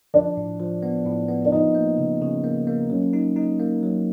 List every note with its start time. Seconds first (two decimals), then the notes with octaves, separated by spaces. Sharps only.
0.14 F3 D4
0.37 A2
0.60 F3
0.83 B3
1.06 A2
1.28 B3
1.45 D4
1.52 F3 D#4
1.75 A#3
1.98 C#3
2.21 C#3
2.44 A#3
2.67 A#3
2.90 F#3 C#4
3.13 D#4
3.36 D#4
3.60 A#3
3.83 F#3